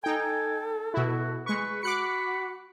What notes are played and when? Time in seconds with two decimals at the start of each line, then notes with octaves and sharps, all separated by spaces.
0.04 D#4 A4 G5 G#5
0.94 B2 E4 F#4
1.46 G#3 B4 C#6
1.83 F#4 B5 D6 F#6 C#7